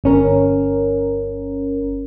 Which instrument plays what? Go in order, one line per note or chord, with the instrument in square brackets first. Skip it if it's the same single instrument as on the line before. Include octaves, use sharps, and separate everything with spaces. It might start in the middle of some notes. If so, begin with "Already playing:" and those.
[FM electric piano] G1 C#4 A#4